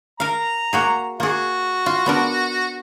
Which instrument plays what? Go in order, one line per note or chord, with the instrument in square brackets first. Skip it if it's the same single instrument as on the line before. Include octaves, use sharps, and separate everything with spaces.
[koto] A#4 F5 [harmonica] A#5
[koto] A#3 F#4 G#4
[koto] A#3 G#4 [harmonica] F#4
[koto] F4
B3 D4 A#4